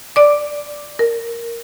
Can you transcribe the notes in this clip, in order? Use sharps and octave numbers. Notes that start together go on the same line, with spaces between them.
D5 D6
A#4